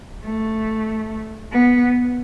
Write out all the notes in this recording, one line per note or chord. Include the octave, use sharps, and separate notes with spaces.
A3
B3